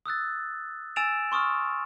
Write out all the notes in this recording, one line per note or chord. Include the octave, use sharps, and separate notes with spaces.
D#6 E6 F#6 A6
G#5 E6 A6 D7 E7 F7
C6 C#6 D#6 F6